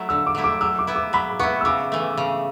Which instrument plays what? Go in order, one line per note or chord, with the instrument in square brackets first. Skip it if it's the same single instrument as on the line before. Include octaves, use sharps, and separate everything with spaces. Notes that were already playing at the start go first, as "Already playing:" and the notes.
Already playing: [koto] F#3 A3 E4
[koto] D3 [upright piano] E6
[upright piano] D6
[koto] F#3 A3 E4
[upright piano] D6
[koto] F#3 [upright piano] E6
[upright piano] D6
[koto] B3 E4
[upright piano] D6
[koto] F#3 [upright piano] B5
[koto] B3 [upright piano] C#6
[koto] E4
[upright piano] E6
[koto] C#3 [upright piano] D6
[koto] E3 A3
C#3